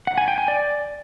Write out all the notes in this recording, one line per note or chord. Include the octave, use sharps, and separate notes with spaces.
F#5
G#5
G5
G#5
D5